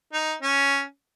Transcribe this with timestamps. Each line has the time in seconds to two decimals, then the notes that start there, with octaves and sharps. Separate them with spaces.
0.13 D#4
0.42 C#4